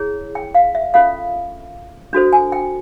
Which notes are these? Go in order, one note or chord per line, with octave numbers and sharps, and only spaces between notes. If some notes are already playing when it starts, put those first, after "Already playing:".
Already playing: E4 G#4 C#5
G5
F5
E5
C#4 F4 A4 F5
D4 F#4 A4 C5
G#5
G5